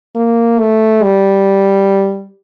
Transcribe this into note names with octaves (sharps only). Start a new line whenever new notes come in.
A#3
A3
G3